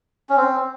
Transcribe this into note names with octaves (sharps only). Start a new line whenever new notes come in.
C#4
C4